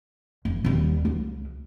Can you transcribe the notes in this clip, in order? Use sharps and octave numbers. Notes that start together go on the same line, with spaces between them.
F1
D#2 G3
C#2